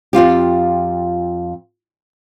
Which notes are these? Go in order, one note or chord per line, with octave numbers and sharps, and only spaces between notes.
F2 G#2 F4 G4